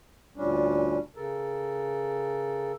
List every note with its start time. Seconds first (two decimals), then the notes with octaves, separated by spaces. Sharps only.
0.36 D2 A#2 G3 C#4 D4
1.16 C#3 A4 A#4